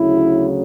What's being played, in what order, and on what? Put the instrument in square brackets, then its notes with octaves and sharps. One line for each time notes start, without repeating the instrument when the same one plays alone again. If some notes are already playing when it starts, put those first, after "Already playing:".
Already playing: [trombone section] D2 C#3 F#3 E4